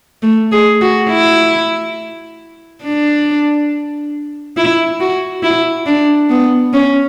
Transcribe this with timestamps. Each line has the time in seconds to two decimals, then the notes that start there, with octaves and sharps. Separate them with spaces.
0.23 A3
0.52 G#4
0.81 F#4
1.10 E4
2.84 D4
4.57 E4
5.00 F#4
5.43 E4
5.86 D4
6.30 B3
6.73 C#4